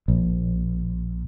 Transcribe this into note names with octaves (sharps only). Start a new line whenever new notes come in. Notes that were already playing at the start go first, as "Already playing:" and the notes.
A#1